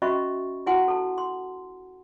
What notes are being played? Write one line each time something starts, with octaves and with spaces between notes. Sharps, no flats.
C#4 F#4 D#5 E5 B5 C#6
E4 F#4 F#5 G#5 C6
A4 A5
C6